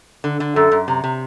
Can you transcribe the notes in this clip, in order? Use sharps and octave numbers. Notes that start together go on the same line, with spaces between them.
D3
D3
F#2 A4
F#2
C3
C3